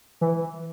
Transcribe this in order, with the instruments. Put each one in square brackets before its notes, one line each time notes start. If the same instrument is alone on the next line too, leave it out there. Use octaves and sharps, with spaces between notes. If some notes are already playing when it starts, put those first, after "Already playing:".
[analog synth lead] E3